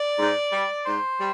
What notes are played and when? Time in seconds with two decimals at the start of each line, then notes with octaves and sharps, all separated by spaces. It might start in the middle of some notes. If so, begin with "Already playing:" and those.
Already playing: D5
0.18 G#2
0.52 G3
0.85 G#2 C5
1.18 G3